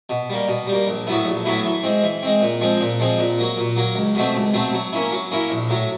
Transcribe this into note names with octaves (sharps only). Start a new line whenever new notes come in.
B2
G3 A#3
B2
G3
A#3
A#1
A2 F#3 B3 E4
A#1
A2 F#3 B3 E4
E3
G#3 C4
E3
G#3 C4
A#2
F3 G#3 C4
A#2
F3 G#3 C4
A#2
F#3 A#3
A#2
F#3 A#3
C#2
B2 F#3 A3 C4
C#2
B2 F#3 A3 C4
F#3
A#3 C#4 E4
F#3
A#3 C#4 E4
A#1
A2 F#3